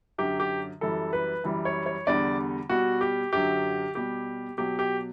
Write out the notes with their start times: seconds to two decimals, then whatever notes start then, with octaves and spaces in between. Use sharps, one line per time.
0.18 F#2 D3 F#3 G4
0.40 G4
0.81 F#2 E3 G3 A4
1.13 B4
1.44 F#2 E3 G3
1.65 C#5
1.86 C#5
2.07 E2 D3 G3 D5
2.69 B2 G3 F#4
3.01 G4
3.33 F#2 D3 F#3 G4
3.95 B2 G3 G4
4.58 B2 F#3 G4
4.79 G4